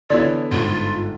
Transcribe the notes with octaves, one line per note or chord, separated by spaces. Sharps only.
D3 E3 B3 E4 A4 C#5 D5
G1 G#2 F4